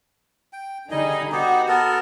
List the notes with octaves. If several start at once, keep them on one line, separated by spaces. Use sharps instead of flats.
G5
D3 G3 D#4 G#4 D#5
B3 D#4 F#4 G4
B3 A4 A#4